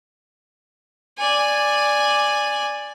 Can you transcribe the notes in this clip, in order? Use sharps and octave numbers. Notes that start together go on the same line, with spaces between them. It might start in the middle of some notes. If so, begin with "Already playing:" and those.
D5 G#5